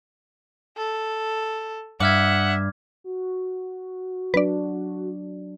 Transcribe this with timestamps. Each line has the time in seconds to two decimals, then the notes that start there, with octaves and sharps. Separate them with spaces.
0.77 A4
2.00 G2 E5 F#5 D6 F6 G#6
3.04 F#4
4.34 F#3 D4 B4 D5